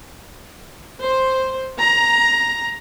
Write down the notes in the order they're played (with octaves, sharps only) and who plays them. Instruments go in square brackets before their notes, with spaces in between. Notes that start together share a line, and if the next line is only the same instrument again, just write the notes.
[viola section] C5
A#5